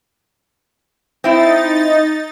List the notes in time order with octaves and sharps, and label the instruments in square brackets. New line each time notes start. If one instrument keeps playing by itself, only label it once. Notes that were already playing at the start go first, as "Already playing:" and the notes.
[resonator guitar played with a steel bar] C4 E4 [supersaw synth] D#4 A6